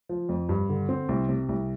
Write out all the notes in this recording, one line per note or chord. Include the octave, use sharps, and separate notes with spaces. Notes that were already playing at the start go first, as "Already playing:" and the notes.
F3
F2
G2
D3
C4
C2
C3
C2